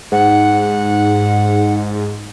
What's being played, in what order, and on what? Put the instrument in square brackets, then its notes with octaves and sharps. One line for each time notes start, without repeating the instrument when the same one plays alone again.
[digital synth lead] G#2 [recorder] F#5